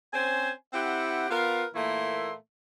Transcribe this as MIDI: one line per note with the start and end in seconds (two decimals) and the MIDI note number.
0.13 0.51 60
0.13 0.51 61
0.13 0.51 72
0.13 0.51 80
0.73 1.29 60
0.73 1.29 64
0.73 1.29 67
0.73 1.29 78
1.30 1.64 59
1.30 1.64 65
1.30 1.64 70
1.30 1.64 71
1.30 1.64 77
1.74 2.33 46
1.74 2.33 52
1.74 2.33 57
1.74 2.33 58
1.74 2.33 64
1.74 2.33 84